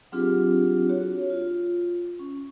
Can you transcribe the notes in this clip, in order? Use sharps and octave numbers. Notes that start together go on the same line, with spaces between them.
F#3 C4 D4 F4 G4 G#4
F#4 C#5
F4
C#4